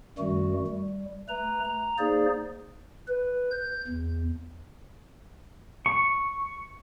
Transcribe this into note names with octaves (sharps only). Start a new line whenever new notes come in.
F#2 D#3 G3 A3 F#4
G3
A3 B4 A#5
A#5
A#3 D#4 G#4 C5 D5
B4
G6
E2
C#6